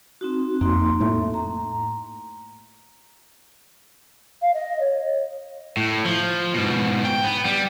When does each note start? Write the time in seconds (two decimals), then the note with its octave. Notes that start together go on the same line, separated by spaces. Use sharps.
0.21 C4 D#4 F#4
0.61 F2 A#3 D#4 C6
1.00 A2 A3
1.34 A#5
4.42 F5
4.54 D#5
4.80 C#5
5.77 A2
6.05 F3
6.54 G#2 B2
7.05 G5
7.24 B3
7.45 G3